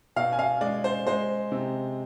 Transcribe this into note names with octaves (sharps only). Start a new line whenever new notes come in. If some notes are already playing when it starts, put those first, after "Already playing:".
B2 F5
G#5
F5
G#3 D5
C5
G#3 C5
C3